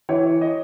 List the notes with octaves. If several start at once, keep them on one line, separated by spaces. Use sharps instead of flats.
E3 C#5
D#5